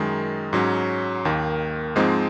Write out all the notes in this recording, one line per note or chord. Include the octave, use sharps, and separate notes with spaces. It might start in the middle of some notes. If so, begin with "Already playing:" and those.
Already playing: F#2 D#3 G#3
G#2 F#3 C#4
D#2 D#3 A#3
G#2 F3 G#3 C4 D#4